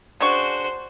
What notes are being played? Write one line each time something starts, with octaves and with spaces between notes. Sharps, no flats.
C#3 D4 F#4 C5 C#6